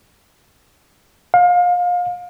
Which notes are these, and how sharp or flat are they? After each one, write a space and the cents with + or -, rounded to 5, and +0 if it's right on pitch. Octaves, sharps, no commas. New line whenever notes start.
F5 +30